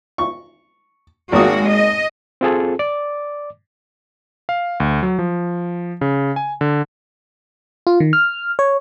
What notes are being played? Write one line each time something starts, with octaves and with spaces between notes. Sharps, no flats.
C#6
G#1 G#3 A#3 F#4 D#6
D#5
C4 F4 G#4 A4
D5 D6
F5
D2
F#3
F3
C#3
G#5
D3
F4
D#3
F6
C#5